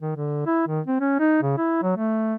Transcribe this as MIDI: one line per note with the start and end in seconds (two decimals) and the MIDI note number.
0.01 0.15 51
0.16 0.43 50
0.46 0.65 64
0.67 0.81 51
0.87 0.99 60
1.00 1.19 61
1.20 1.39 63
1.42 1.54 49
1.57 1.82 64
1.82 1.92 54
1.97 2.35 57